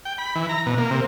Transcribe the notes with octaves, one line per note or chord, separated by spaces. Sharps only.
G5
B5
E3
A#5
B2
A#3
C3